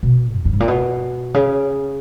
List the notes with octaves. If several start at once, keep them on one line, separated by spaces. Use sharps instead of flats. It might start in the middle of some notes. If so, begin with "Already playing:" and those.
B2
E2
G2
G#2
A#2
B2
C#3